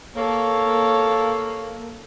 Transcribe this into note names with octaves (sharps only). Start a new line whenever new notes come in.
A#3 A4 C#5